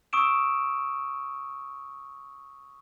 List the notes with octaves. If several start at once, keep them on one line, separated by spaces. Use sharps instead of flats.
C#6 D#6 E6 D7 E7